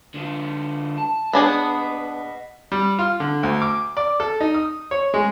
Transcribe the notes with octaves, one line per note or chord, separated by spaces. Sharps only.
D3 F4
A5
B3 D4 G#4 D#5 F#5
G3
F4
D3
D2
D6
D5
A4
D#4
D#6
C#5
G#3